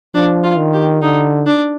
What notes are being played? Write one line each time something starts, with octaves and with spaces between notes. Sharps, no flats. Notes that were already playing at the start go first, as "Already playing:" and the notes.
F3 D4
F4
D#3
G4
D3 D#4
D4